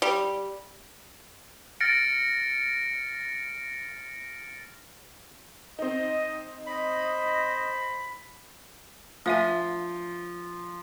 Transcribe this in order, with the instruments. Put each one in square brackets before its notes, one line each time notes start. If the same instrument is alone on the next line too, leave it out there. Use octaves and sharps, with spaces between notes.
[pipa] G3
[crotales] F6 A6 A#6 C#7 D7
[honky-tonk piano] C4 D#4 [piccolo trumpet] D#5
[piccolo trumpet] C5 [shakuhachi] D#5 [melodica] B5
[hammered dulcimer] F3 [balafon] A3 E5 G#5